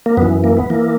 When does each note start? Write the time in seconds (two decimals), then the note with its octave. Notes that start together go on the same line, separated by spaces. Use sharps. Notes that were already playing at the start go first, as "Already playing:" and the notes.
0.06 A#3
0.17 F#2 B3
0.22 E3
0.44 A#3
0.57 B3
0.70 E3 A#3